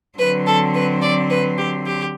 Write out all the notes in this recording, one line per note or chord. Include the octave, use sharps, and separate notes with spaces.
D3 F#3 C4 B4
A4
B4
D5
B4
G4
G4